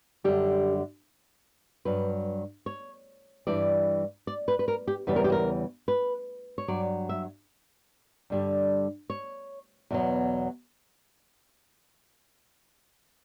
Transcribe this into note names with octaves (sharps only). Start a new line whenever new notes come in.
F#2 D3 G3 G4
G2 F#3 B4
C#5
G2 E3 G3 D5
D5
B4
B4
A#4
G4
E2 C#3 E3 G3 B4
A#4
G4
A#4
B4
C#5
G2 F#3 D5
E5
G2 D3 G3
C#5
E2 B2 F#3